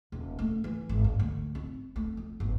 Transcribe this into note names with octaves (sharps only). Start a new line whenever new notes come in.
D#1
A3
E3
G#1
G2
D2
C4
A3
F2
G1